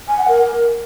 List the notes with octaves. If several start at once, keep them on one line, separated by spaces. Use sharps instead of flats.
G#5
F#5
A#4